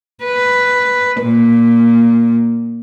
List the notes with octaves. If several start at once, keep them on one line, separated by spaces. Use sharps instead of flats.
B4
A#2